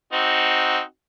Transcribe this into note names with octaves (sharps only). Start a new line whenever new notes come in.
C4 D#4 F#4